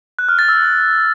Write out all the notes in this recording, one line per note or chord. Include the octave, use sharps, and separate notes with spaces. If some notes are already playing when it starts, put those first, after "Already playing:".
F#6
F6
A6
E6